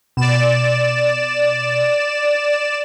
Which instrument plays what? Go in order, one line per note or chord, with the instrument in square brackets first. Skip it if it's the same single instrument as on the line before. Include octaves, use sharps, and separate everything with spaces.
[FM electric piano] B2 [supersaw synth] D5 E7